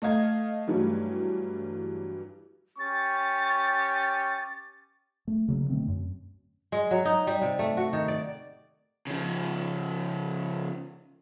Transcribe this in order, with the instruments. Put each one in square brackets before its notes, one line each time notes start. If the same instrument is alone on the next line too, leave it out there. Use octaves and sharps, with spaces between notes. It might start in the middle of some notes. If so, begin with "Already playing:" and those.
[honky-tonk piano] A3 D#5 F5 G#6
G2 E3 F#3 G3 A3
[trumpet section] C#4 G4 C#6 [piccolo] A6
[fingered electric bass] A3
C#3 F#3 A#3
B2 D3 A3 C4
F#2
[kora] G#3
F#3
D#4
G3
C3
A3
F#4
D#3
D5
[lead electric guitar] C#3 F3